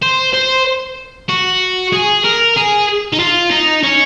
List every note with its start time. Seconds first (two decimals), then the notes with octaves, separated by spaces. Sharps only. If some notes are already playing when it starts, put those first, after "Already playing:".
0.03 C5
0.33 C5
1.29 F#4
1.92 G#4
2.24 A#4
2.56 G#4
3.12 D#4
3.19 F4
3.51 D#4
3.84 C#4